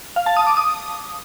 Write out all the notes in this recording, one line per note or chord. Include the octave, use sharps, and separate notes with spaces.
F5
A5
D#6
D6
D#6